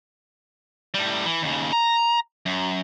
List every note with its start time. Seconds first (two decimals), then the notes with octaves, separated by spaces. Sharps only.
0.94 A2 G3
1.26 E3
1.42 D#2 C#3
1.73 A#5
2.46 F#2